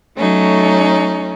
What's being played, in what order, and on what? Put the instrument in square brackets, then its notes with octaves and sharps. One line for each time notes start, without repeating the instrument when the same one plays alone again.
[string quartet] F#3 A3 C#4 D#4